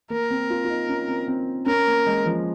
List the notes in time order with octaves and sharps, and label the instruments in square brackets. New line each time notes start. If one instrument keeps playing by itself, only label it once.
[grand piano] A#3 [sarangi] A#4
[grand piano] C4
F4
F4
D#4
C#4
C4
C4
[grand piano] C#4 [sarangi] A#4
[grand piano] A#3
G#3
F3